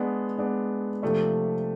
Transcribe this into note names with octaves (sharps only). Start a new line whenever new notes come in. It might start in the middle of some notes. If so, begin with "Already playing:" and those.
Already playing: G#3 B3 D4
G#3 B3 D4
C3 F3 A3 D4